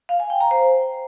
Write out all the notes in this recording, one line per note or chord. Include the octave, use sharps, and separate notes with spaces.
F5
G#5
G5
A#5
C5